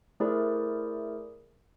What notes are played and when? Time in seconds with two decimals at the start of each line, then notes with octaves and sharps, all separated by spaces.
0.20 A3 E4 G#4 A#4 C5 D5